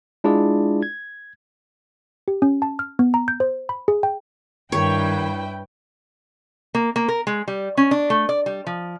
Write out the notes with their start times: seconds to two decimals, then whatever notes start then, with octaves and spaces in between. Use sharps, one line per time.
0.24 G#3 D4 E4 F4 G#4 D5
0.83 G#6
2.28 G4
2.42 C#4
2.62 A5
2.79 F6
2.99 B3
3.14 A#5
3.28 G6
3.40 C5
3.69 B5
3.88 G#4
4.03 G5
4.72 G2 D#3 E4 B4 C#5 G5
6.75 A#3
6.96 A#3
7.08 A#4
7.27 G#3
7.48 G3
7.77 C#4
7.91 D4
8.10 A3
8.29 D5
8.46 G3
8.67 F3